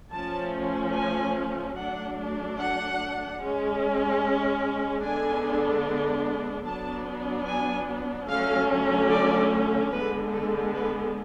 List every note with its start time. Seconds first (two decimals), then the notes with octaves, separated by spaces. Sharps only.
0.13 F3 A3 C#4 A5
0.95 G#5
1.76 F#3 A3 D4 F#5
2.58 F#5
3.40 G#3 C#4
5.03 D3 G#3 B3 D4 G#5
6.66 F#3 B3 D4 A5
7.47 G#5
8.29 D3 F#3 A3 C#4 F5
9.10 D5
9.92 D3 G#3 B3 B4
10.33 A4
10.73 B4